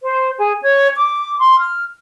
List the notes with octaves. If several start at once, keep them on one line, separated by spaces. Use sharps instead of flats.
C5
G#4
C#5
D6
C6
F6